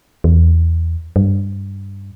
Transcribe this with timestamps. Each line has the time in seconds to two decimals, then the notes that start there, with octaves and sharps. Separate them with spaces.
0.24 E2
1.16 G2